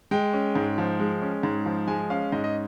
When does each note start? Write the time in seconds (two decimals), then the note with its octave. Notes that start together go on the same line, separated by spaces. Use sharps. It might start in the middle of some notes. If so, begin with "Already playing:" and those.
0.11 G#3 G5
0.33 C#4
0.56 G#2
0.78 F3
1.00 G#3
1.22 C#4
1.43 G#2
1.66 F3
1.88 G#3 G#5
2.10 C#4 F5
2.32 G#2 D#5
2.44 D#5